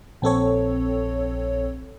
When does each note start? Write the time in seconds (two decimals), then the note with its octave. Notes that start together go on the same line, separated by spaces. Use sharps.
0.22 A#1 C4 A4 C#5